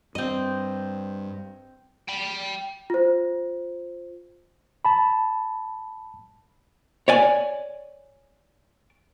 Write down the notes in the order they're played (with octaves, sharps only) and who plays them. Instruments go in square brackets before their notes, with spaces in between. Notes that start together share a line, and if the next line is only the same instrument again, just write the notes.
[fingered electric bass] G2 [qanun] C4 D#5
[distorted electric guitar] G5 B5
[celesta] F4 C5
[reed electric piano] A5 B5
[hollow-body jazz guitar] C#5 D5 G#5